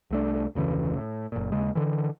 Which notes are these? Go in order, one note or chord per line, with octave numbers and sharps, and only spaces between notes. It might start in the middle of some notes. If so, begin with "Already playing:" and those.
C2 A3 D4
F1 D2 C#3 E3
A2
F#1 A#2
D#2 C#3 G#3
D3 E3